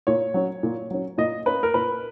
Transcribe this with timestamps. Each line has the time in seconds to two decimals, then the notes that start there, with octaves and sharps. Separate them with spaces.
0.07 A#2 C#5
0.34 F#3 C#4
0.63 A#2
0.91 F#3 C#4
1.18 A#2 D#5
1.46 A#3 C#4 B4
1.63 A#4
1.74 A#2 B4